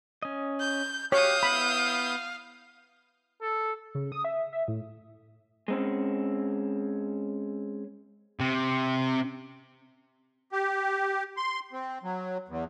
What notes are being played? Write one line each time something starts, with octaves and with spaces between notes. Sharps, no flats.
C#4 D#5
G6
G4 C#5 F5 D#6 F#6 G6
B3 E4 B5
A4
C#3
D#6
E5
E5
A2
G#3 C4 C#4
C3
G4
C6
C4
F#3
E2